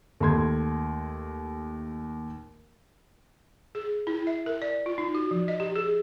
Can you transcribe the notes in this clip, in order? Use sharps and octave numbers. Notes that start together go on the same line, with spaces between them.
D#2 A3 C6 G#6
G#4
E4
E5
A#4
D5
F4
D#4
F#4
F3
D#5
G4
G#4